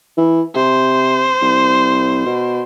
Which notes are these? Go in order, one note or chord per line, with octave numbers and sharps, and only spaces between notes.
E3
C3 C5
C2
B2